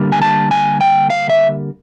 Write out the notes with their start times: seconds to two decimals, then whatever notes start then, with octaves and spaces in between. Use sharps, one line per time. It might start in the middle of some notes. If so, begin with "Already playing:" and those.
Already playing: D3 G3 A#3
0.12 G#5
0.22 A5
0.51 G#5
0.81 G5
1.10 F5
1.29 E5